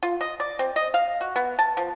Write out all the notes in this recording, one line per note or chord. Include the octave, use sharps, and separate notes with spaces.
F4
D#5
D5
C4
D#5
F5
F#4
B3
A5
F3